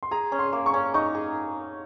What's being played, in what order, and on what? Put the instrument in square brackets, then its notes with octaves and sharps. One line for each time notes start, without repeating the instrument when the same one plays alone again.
[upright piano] C6
[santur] G#4 [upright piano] A#5
[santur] C#4
[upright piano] C6
[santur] A#3
[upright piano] C#6
[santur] C#4
[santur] D#4 [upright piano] C#6
[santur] G#4